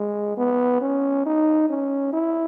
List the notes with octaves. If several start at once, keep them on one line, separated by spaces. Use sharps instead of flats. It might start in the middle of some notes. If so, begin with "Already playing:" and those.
Already playing: G#3
B3
C#4
D#4
C#4
E4